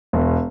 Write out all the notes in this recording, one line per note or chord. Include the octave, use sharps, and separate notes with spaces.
E1